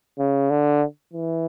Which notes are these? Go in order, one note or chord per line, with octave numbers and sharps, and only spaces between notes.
C#3
D3
E3